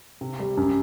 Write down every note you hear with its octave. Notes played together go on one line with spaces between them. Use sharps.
C3
G3
F#2